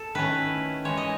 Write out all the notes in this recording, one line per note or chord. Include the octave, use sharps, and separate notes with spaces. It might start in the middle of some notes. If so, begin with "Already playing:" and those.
Already playing: A4
D#3 A3 C#4 E4 B4
E3 G#3 D#4 C#5
D#5